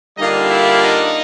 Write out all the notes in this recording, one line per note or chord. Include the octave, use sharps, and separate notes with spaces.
D3 G3 A#3 D4 D#4 F4 D#5
E4 E5
D#4 D#5